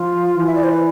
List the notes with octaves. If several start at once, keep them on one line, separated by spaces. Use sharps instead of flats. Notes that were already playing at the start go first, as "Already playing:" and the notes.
Already playing: F3 F4
E3
E5
D5
C5
B4